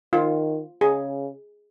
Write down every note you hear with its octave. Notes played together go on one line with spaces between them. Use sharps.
D#3 F4
C#3 G#4